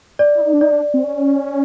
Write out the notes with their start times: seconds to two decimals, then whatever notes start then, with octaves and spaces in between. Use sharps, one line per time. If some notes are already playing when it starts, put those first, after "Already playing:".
0.19 D5
0.35 E4
0.41 D#4
0.53 D4
0.61 D#4 D5
0.72 D4
0.94 C4
1.04 C#4